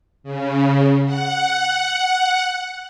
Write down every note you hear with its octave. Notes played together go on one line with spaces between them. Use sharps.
C#3
F#5